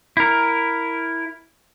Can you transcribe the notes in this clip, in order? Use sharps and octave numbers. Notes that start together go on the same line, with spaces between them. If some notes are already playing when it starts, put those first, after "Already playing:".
E4 A#4